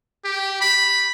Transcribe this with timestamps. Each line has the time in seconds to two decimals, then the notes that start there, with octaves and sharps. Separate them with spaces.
0.25 G4
0.61 B5